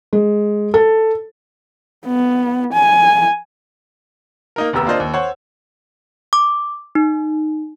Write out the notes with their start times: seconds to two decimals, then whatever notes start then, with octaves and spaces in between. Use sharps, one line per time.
0.13 G#3
0.74 A4
2.07 B3
2.74 G#5
4.56 A#3 D#4 A#4
4.73 F1 D#2 B3 G4 A#5 E6
4.86 A#3 D4 F4 C5 D#5
5.00 D#2
5.14 C5 C#5 F#5
6.33 D6
6.95 D#4